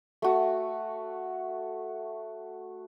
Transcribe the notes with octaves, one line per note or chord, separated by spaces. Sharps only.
A3 F#4